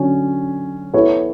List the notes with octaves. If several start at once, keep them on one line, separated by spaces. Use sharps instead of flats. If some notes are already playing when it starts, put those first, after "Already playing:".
Already playing: D3 F#3 C#4
B3 E4 A4 C#5